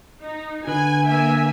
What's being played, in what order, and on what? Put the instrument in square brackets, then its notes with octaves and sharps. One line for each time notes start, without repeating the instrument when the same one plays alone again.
[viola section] D#4
[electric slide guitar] D3 B4 [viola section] G#5
[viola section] A#3 E5 G#5